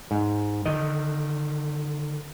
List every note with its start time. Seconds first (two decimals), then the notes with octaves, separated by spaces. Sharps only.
0.11 G#2
0.65 D3 D#3 D#5